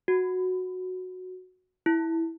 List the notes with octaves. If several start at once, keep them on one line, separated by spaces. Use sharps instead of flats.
F#4
E4